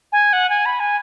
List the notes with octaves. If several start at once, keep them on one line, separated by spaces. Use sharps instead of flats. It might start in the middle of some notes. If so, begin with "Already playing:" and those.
G#5
F#5
G#5
B5
G#5